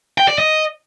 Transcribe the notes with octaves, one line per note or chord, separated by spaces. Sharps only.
G5
D5
D#5